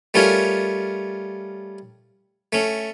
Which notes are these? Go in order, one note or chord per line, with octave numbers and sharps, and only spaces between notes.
G3 A3 C#4 F4 A#4 C#5
A3 C#4